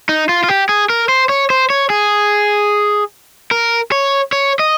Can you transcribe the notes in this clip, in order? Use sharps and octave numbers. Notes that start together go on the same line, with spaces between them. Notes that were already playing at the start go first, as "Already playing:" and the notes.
D#4
F4
F4
G4
G#4
A#4
C5
C#5
C5
C#5
G#4
A#4
C#5
C#5
D#5